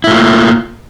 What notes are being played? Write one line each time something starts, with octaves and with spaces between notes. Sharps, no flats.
A3 A#3 E4 F4